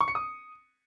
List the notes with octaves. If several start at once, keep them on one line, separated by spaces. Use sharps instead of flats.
C#6
C#7
D#6